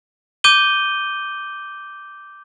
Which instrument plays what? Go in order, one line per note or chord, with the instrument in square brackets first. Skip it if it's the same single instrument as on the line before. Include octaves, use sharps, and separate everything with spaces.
[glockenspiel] D6 G6 D#7 G7